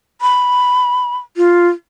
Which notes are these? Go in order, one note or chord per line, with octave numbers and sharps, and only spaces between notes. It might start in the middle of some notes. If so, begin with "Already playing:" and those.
B5
F4